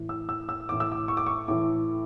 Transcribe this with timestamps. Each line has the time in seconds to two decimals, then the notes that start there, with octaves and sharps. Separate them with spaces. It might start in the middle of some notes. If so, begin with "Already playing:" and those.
Already playing: A2 E3
0.09 E6
0.29 E6
0.49 E6
0.69 A2 E3 D6
0.80 E6
0.92 D6
1.08 C#6
1.17 D6
1.26 C#6
1.48 A2 E3 D6